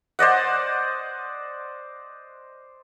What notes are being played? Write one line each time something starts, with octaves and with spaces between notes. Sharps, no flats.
C5 D5 D#5 F#5